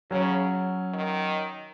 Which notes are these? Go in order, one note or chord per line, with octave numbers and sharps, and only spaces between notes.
C#3 F#3 C#4
D#3